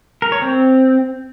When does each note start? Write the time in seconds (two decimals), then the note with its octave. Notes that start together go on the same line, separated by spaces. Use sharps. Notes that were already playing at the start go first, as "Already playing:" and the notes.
0.22 A#4
0.32 C#5
0.42 C4